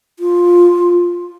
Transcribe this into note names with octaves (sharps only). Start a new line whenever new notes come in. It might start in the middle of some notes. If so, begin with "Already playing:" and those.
F4